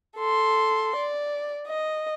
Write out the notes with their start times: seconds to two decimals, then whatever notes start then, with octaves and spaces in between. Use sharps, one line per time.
0.17 A4 C6
0.96 D5
1.67 D#5